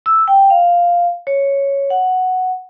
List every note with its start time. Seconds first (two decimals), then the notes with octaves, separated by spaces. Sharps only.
0.06 E6
0.28 G5
0.50 F5
1.27 C#5
1.90 F#5